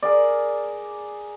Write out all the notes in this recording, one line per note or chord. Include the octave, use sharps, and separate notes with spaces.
G#4 A#4 D5